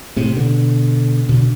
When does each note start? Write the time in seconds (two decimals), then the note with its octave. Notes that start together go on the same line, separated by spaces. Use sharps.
0.16 A2 C3
0.36 B2 D3
1.29 B2 D3